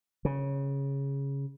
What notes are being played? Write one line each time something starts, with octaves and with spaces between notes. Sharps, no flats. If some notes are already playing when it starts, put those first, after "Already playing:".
C#3